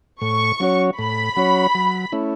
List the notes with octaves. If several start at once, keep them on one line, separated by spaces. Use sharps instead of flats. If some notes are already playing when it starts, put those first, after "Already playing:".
A2 C#6
F#3 C#4 F#4 C#5
A2 B5
F#3 C#4 F#4 C#5
F#3
A3 C#4 E4